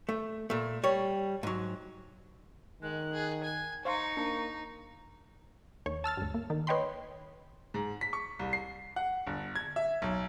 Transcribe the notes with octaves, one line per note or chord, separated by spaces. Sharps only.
A3
A#2 A3
G3 C#5
G#2 F#3
D#3 G#3 F#6
G#4
G#5
D#4 C5 F5 C6 C#6
A#3 D4
D#2 C#5
A5 E6 F6 A6
D2 G2
A#3
D#3
B4 C#5 D#5 G5 B5 C6
G#2
B6
C#6
C2
C7
F#5
G1
G#6
E5
B1